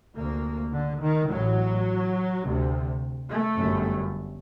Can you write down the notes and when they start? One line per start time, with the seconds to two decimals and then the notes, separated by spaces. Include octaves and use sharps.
0.16 D2 C3 A#3
0.73 D3
1.02 D#3
1.30 A1 A2 F#3
2.44 D2 C3
3.30 A3
3.59 G1 F#2